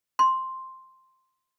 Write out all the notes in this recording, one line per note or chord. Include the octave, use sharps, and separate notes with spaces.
C6